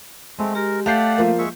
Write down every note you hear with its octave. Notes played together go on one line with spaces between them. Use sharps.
G#3 A3 C4
G4 A#4
A3 G4 D5 F5 F#5 A5 G6 C7
F3 A#3
G#3 E5 C#6